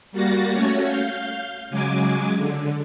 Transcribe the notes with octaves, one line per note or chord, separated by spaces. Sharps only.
G3 A#3 F#4 A6 A#6
A3 C#4 F#4 C#5
F5 G6
C#3 F#3 G#3 G#5 D6
D3